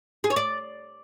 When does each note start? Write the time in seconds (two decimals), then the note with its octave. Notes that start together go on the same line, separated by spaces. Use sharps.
0.24 G#4
0.30 C#5
0.36 D5